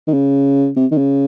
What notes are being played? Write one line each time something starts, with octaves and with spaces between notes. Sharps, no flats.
D#3
C#3
C3
D#3
C#3